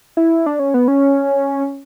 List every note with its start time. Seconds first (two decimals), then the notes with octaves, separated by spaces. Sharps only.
0.17 E4
0.46 D4
0.59 C#4
0.74 B3
0.88 C#4